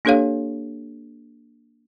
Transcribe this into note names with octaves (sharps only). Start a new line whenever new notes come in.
A#3 D4 G4 A4 C#5 F5